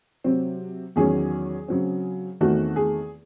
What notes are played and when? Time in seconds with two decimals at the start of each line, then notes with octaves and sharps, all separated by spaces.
0.24 C3 F#3 C4
0.96 E2 D#3 F#3 C#4 G#4
1.68 C#3 F#3 C4
2.41 E2 D#3 A3 C4 F#4
2.76 G#4